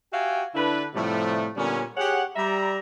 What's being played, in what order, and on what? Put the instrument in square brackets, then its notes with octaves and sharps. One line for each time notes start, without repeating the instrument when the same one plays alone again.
[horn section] F#4 G4 E5 F5 G5 G#5
D3 D4 E4 B4
A2 C3 F3 G3 A3
A#2 D3 G3 B3 C#4
G4 G#4 C#5 F#5
G3 E5 A#5